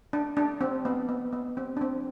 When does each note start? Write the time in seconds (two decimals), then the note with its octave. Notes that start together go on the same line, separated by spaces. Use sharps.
0.13 D4
0.37 D4
0.61 C4
0.85 B3
1.09 B3
1.32 B3
1.57 C4
1.77 D4
1.81 C4